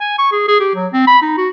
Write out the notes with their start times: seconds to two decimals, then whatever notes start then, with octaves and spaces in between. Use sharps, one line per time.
0.01 G#5
0.19 C#6
0.32 G#4
0.48 G#4
0.60 G4
0.75 F#3
0.93 C4
1.07 B5
1.22 D#4
1.37 F#4